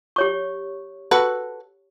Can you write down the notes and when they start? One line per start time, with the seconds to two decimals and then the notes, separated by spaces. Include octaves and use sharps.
0.16 G4 C#5 C#6
1.11 F#4 A4 B4